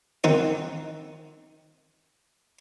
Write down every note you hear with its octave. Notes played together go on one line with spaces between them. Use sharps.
D#3 C4 D#4 F#5